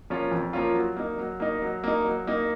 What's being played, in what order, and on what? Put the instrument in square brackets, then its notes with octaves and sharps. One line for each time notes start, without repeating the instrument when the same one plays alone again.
[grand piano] F3 A#3 C#4 F4
F2
F3 A#3 C#4 F4
F#3
A#3 D#4
F#3
A#3 D#4
F#3
A#3 D#4
F#3
A#3 D#4